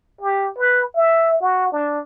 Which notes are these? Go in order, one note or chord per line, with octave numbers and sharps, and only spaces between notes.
G4
B4
E5
F#4
D4